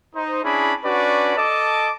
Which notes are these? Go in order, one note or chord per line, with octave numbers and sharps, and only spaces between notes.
D#4 C5
C#4 D4 E4 G#4 B5
C#4 D4 F#4 B4 D5
A4 D#5 A5 D6